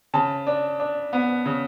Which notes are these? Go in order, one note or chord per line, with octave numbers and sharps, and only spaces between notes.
C#3 A5
D4
D4
B3
C#3